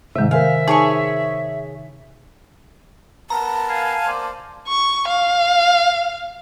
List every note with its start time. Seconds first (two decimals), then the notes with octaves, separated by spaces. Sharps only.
0.16 G#2 C3 D#3 E5
0.31 A#4 C5 E5 F5 G#5
0.68 D#4 G#4 C#5 A5 C#6
3.30 B3 A#4 A5 A#5
3.69 F5 G#5
4.06 A#3 C5 D5
4.68 C#6
5.08 F5